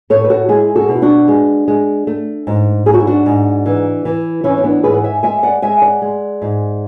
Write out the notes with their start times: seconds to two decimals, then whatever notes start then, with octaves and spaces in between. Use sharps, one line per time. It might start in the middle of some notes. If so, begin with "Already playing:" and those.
0.10 A2 A4 C#5
0.24 B4
0.30 F#4 A4
0.49 G#3 E4 G#4
0.76 F#4 A4
0.88 B2 E4
1.02 D4 F#4
1.28 G#3
1.68 G#3
2.07 A3
2.47 G#2
2.86 G#2 G#4
2.94 F#4
3.00 E4
3.07 D4 F#4
3.26 G#2
3.66 E3
4.05 E3
4.44 E3 C#4 E4
4.58 C#4
4.64 B3 D4
4.83 G#2 G#4 B4
4.94 F#5
5.04 E5 G#5
5.23 G#3 E5 G#5
5.43 D5 F#5
5.62 G#3 E5 G#5
5.82 D5 F#5
6.02 G#3
6.42 G#2